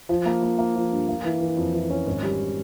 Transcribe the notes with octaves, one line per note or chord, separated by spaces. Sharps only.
F3
A#3
A#3
A#3
F3
G2
A#3
E3
E3
F2
E3
C#4
G#1
G3